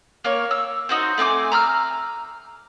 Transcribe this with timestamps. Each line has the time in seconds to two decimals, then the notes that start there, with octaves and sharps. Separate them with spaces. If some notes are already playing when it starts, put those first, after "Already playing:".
0.24 A#3 C#5
0.51 E6
0.89 D#4 F#4 C5
1.18 A3 C4 G#5 D6
1.52 A#5 B5 E6 F6